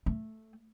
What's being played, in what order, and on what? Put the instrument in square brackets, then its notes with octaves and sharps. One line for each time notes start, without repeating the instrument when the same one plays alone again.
[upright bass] A3